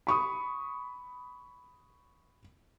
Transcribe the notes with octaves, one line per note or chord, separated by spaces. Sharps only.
B5 C#6 D#6